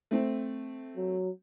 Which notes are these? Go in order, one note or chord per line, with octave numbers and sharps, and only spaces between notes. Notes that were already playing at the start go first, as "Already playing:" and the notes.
A3 C4
F#3